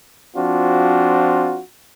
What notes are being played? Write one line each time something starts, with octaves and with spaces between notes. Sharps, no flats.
F3 C4 D4 F4 F#4